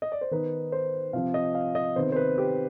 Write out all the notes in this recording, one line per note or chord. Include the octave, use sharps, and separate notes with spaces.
D#5
D5
C5
D#3 B3 D#4 B4
C5
C3 F3 C4 F5
D#5
F5
D#5
C3 D#3 B3 C5
C5
B4
G4